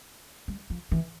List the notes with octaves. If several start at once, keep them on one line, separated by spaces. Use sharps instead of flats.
G3
F3
E3